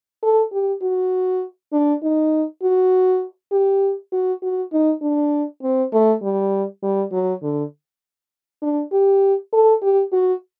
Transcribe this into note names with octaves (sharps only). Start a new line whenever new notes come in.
A4
G4
F#4
D4
D#4
F#4
G4
F#4
F#4
D#4
D4
C4
A3
G3
G3
F#3
D3
D4
G4
A4
G4
F#4